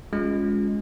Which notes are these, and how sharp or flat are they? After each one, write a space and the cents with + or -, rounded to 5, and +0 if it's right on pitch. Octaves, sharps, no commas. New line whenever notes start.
G#3 +0 C#4 +20 F4 +25